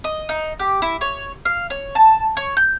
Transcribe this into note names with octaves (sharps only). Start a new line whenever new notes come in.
D#5
D#4
G4
E4
C#5
F5
C#5
A5
C#5
G6